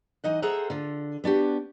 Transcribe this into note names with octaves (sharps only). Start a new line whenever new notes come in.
E3 D#4 D#5 F#5
G#4 A4 C5 E5 F#5 A#5
D3 F4
B3 D4 F#4 G4